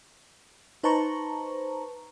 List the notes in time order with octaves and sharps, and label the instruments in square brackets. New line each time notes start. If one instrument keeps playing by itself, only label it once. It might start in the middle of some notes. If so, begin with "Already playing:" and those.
[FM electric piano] D#4 B4 C5 A5 A#5 C#6